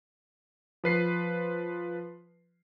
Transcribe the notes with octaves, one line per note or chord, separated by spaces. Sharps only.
F3 B4 C7